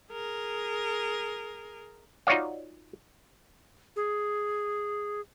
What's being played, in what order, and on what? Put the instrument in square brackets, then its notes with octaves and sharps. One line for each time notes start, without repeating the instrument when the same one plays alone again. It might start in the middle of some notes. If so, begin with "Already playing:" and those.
[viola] G#4 A#4
[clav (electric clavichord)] D#4 F4 F#4 C#5 D5 F5
[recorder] G#4